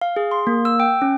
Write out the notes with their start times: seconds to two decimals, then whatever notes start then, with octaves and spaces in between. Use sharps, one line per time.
0.01 F5
0.16 G#4
0.31 C6
0.47 A#3
0.65 E6
0.80 G5
1.02 C#4